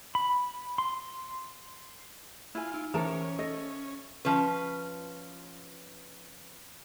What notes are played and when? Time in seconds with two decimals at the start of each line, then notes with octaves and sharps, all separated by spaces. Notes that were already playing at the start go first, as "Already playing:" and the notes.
0.15 B5
0.78 C6
2.55 E4 F4 G#5
2.74 D#4
2.94 E3 C#4 A#4 C5 C#5 E5 A5 A#5
3.39 A4 D#5
4.25 F3 C#4 B4